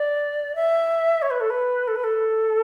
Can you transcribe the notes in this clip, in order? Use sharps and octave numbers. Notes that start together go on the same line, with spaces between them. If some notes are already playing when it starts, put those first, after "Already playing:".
Already playing: D5
E5
C#5
B4
A4
B4
A4
B4
A4